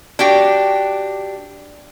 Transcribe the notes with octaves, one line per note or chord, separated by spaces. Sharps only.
D4 F#4 G4 G5